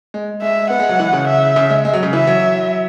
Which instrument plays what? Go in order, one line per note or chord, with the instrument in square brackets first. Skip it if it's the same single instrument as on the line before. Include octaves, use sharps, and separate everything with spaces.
[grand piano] G#3
[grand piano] G#3 [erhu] E5
[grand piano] B3 [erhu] F#5
[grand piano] G#3
F#3
E3
C#3
[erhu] E5
[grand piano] C#3
G#3
G#3
F#3
C#3
[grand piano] E3 [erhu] E5
[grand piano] F#3